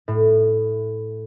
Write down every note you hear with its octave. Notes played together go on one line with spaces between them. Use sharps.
A2